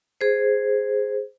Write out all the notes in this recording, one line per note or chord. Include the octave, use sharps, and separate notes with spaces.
G#4 C5